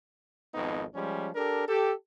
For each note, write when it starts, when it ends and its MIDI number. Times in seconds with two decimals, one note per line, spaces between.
0.53 0.85 32
0.53 0.85 41
0.53 0.85 59
0.53 0.85 63
0.94 1.29 53
0.94 1.29 55
0.94 1.29 56
0.94 1.29 61
1.35 1.66 62
1.35 1.66 67
1.35 1.66 69
1.35 1.66 70
1.68 1.92 67
1.68 1.92 69